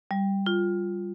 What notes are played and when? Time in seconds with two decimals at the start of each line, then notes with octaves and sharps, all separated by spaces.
0.11 G3
0.46 F4